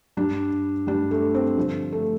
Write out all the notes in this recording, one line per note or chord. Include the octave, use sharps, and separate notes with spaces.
G2 G3 D4
G2 G3 D4
A3
C4
G2 D3 F3
A3